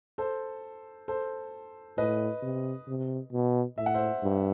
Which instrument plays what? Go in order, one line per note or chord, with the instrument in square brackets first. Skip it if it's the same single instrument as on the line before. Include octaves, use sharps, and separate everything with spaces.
[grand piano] A4 C5
A4 C5
[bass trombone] A2 [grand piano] B4 D#5
[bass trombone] C3
C3
B2
[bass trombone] A2 [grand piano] E5
[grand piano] F#5
C5 E5
[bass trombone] G2